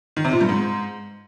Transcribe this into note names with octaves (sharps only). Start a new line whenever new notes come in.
D#3
C3
A#2
G2
G#2